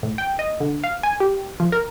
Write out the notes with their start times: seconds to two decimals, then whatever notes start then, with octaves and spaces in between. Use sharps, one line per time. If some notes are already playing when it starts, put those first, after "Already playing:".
0.03 A2
0.18 G5
0.39 D#5
0.60 D3
0.84 F5
1.03 G#5
1.20 G4
1.60 F3
1.72 A#4